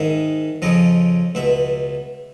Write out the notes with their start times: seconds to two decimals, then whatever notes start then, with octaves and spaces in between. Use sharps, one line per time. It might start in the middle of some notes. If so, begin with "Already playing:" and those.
Already playing: G#2 D#3 E5
0.62 F2 C#3 F3 D#5
1.35 C#2 B2 E5